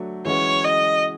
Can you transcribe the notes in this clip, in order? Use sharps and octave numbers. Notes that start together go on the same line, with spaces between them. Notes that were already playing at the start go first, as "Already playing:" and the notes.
Already playing: F#3 A3 D4 F#4
E3 G#3 C#4 F#4 B4 C#5
D#5